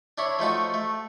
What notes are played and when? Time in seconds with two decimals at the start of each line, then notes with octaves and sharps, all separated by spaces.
0.18 D4 E4 C#5
0.39 F3 A3 D#4 F#4
0.74 A3